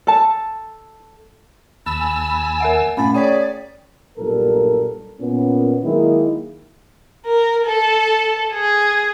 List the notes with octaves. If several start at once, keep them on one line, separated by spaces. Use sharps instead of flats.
A4 A5
D#2 A5 B5 E6
G#5
A#4 E5 F#5
G2 A#2 A3 C#4 G#5 B5 A6
G#4 C#5 D5 G5 B6
B1 G2 A#2 G3 A4 A#4
A#2 B3 C#4
D#3 F#3 G#3 A#3 E4
A#4
A4
G#4